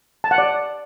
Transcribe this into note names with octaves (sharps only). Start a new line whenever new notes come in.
A5
F#5
D5